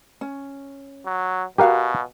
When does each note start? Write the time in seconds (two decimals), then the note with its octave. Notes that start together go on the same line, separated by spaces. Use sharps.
0.21 C#4
1.06 F#3
1.58 B2 F#4 G4 A#4 F5 F#5 G#5